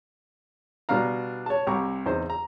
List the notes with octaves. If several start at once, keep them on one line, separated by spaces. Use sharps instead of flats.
B2 G3 D4 F5 A#5
C#5 A5
C2 G4 A#5 C#6
E2 D#4 C5
A#5